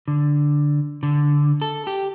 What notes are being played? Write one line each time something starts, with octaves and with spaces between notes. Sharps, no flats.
D3
D3
A4
G4